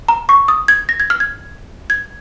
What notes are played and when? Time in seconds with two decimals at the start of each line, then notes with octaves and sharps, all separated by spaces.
0.08 A#5
0.29 C#6
0.48 D#6
0.68 G#6
0.89 A#6
1.00 G#6
1.10 F6
1.20 G#6
1.90 G#6